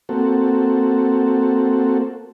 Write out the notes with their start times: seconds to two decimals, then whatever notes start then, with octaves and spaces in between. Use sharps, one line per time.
0.09 A#3 C4 F#4 A4